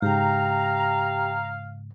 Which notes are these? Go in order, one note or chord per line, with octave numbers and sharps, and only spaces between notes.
G#2 C#3 G4 F5 G5 A#5